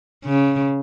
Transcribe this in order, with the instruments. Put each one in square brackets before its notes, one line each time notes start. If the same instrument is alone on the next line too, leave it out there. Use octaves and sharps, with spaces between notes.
[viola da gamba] C#3